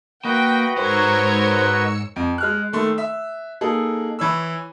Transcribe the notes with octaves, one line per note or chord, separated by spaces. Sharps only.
A#3 F#4 B4 D#5 G5
G#2 A#4 C5 C#5 E6 C#7
F2
G#3 F6 F#6
D#3 A3 C6
E5
A#3 D#4 G#4 A4
E3 C#5 B5 E6